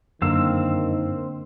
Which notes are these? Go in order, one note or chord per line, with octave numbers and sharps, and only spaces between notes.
F#2 D3 D#3 A#3 C4 F5 E6